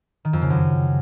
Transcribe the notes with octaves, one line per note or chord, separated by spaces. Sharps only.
D#3
F2
C#3
F#2